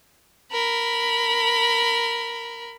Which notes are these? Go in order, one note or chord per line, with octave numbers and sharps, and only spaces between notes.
A#4 B5